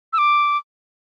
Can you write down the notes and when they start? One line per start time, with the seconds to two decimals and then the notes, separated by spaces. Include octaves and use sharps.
0.13 E6
0.18 D6